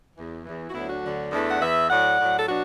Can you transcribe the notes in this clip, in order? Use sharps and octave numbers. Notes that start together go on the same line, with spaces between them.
E2 E3
E2 E3
F#4
D2 D3 F#3 B3 E4
D4 F#4
D2 D3 F#3
E2 E3 A3 D4
F#5
E2 E3 B4 E5
A2 F#3 D5 F#5
A2 F#3
A4
B2 F#3 D4 F#4